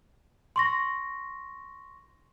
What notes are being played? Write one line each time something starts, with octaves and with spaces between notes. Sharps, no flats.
C6 C#6 A#6